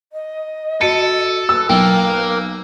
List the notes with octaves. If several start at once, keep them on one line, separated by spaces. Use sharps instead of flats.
D#5
F#4 A4 C#7 D#7
B4 E6
B1 A#3 G5